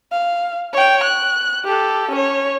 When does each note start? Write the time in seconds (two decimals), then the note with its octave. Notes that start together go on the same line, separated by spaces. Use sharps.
0.12 F5
0.73 C#5 G5
1.04 F#6
1.65 G4 A4
2.11 C#4 C#5